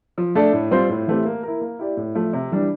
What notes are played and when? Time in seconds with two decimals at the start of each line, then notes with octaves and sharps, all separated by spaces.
0.18 F3
0.35 A3 D4 A4 D5
0.53 A2
0.71 G3 C4 F4 C5
0.89 A2
1.07 E3 A3 C4 G4
1.25 A#3
1.43 E4 A#4
1.61 A#3
1.79 E4 G4 D5
1.97 A2
2.15 F3 A3
2.33 C3
2.51 E3 G3 D4